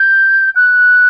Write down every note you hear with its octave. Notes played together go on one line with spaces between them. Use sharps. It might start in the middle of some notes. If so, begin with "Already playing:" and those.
Already playing: G6
F#6